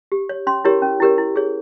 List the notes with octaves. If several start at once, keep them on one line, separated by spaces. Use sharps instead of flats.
G4
C#5
C#4 C6
E4 G4 A#4 C#5
C#4
E4 G4 A#4 C#5
E4
G#4 C#5